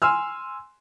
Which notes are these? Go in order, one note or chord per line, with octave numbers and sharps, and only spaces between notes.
G#5 C6 E6 F6